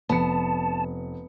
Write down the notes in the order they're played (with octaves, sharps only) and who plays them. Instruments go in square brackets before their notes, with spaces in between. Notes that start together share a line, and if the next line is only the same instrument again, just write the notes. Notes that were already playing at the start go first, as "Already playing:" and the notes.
[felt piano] F1 C#7 [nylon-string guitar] B3 [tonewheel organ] A5